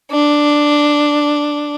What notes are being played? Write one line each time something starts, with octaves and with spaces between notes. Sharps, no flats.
D4